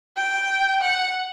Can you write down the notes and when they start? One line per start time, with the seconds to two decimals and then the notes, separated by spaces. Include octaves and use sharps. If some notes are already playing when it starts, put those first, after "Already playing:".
0.17 G5
0.81 F#5